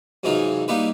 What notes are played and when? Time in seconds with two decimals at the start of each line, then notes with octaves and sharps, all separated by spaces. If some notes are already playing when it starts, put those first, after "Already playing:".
0.23 F#2 C3 E3 G#3 D#4 F4
0.68 G3 A#3 D#4 E4 G4 B4